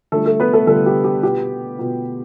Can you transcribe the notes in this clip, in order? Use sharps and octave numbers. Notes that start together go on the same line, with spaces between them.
D3 G3 A3 D4 F4 A4
A3 A4
B3 B4
A3 A4
D3 G3 A3 D4 F4 A4
G4
G4
B2 B3 F4 G4
B2 B3 F4